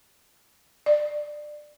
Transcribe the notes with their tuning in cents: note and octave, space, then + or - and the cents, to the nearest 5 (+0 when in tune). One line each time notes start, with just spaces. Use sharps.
D5 +15